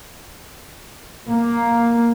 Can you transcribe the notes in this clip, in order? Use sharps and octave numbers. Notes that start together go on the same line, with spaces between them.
A#3